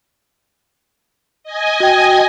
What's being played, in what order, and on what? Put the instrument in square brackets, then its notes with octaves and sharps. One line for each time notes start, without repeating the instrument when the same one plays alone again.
[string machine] D#5 G#5
[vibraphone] F#4 G5